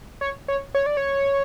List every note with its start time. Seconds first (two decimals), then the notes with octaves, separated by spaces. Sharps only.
0.21 C#5
0.48 C#5
0.75 C#5
0.86 D5
0.97 C#5